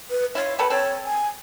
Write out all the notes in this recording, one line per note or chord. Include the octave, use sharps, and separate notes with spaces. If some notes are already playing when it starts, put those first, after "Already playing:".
B4
E4 F4 C#5
C3 A4 B4 B5
C4 A4 C#5
G#5